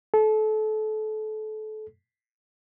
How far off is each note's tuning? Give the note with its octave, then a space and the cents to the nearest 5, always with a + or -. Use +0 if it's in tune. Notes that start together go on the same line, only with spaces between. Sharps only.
A4 -30